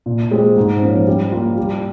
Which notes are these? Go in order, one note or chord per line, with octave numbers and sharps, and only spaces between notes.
A#2
G#3 C4 G4
G#2
F3 A#3 C#4
G3
A#3 F4
G3